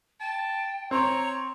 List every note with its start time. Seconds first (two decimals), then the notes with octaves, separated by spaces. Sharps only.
0.20 G5 A5
0.91 C4 C#5 A#5